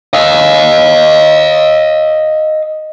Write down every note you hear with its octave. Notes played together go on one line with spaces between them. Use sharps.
D#5 F5